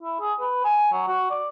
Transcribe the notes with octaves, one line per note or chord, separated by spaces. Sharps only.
E4
G#4
B4
G#5
F#3
F#4
D5